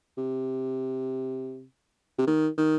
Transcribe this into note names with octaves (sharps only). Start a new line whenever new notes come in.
C3
C3
D#3
D#3